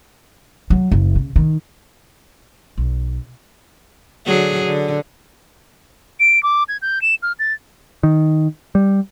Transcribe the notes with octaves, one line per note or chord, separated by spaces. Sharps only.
F#3
F#1
C#3
D#3
B1
D3 F#3 G#4
D3
D7
D6
G#6
G6
E7
F6
A6
D#3
G3